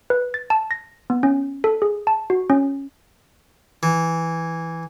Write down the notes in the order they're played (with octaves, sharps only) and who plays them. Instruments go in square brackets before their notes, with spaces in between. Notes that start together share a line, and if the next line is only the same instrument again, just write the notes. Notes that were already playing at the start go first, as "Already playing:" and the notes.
[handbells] B4
A6
A5
A#6
B3
C#4
A4
G#4
A5
F#4
C#4
[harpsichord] E3